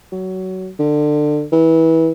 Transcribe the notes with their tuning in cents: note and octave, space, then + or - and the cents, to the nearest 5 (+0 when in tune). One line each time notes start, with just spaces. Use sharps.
F#3 +20
D3 +25
E3 -25